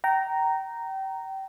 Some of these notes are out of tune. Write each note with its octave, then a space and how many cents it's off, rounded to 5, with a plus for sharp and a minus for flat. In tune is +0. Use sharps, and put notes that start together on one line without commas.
G5 -30 A#5 -5